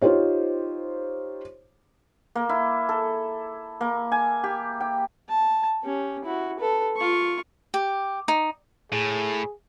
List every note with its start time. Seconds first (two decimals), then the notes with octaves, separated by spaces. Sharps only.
0.01 D#4 F4 G4 C5 C#5
2.35 A#3
2.49 E4
2.89 A4
3.81 A#3
4.12 G#5
4.44 G4
4.81 G5
5.29 A5
5.83 C#4 G4
6.24 E4 F#4
6.59 A4 B4
6.96 F4 C#6
7.74 G4
8.28 D#4
8.92 A2 G#4